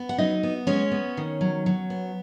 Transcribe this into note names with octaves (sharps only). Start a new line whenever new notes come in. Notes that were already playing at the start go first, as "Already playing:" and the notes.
Already playing: B3
F#5
F#3 D#4 D#5
B3
G#3 C#4 C#5
B3
D#3
F#3
F#3
B3